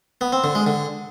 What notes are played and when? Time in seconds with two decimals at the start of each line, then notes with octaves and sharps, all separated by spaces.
0.21 B3
0.32 C4
0.44 D3
0.55 G#3
0.67 D3